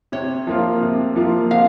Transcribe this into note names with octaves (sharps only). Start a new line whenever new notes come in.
C3 C#5
F3 A#3 F4
C3
F3 A#3 F4
C3 F5